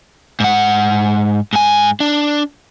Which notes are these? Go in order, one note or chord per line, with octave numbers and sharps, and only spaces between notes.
G#2 F#5
G#2 G#5
D4